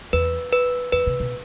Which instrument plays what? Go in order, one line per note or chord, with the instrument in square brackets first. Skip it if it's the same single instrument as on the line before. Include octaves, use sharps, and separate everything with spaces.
[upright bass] E2 [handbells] B4
[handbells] B4
[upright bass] F2 [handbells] B4
[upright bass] C3
B2